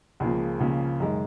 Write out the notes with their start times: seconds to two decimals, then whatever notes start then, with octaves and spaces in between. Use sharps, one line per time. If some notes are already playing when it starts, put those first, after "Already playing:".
0.20 C#2 C#3 F3 A#3 G#4
0.60 C#2 C#3 F3 A#3
1.00 F#2 D#3 G#3